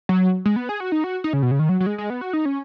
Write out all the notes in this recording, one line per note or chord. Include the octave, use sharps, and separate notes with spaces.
F#3
G#3
B3
G#4
F#4
D#4
F#4
D#4
C#3
B2
C#3
D#3
F#3
F#3
G#3
G#3
B3
F#4
D#4
C#4